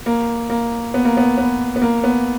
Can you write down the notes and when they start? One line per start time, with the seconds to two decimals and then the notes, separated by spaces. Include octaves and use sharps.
0.06 A#3
0.50 A#3
0.94 B3
1.05 A#3
1.17 B3
1.38 B3
1.76 B3
1.81 A#3
2.04 B3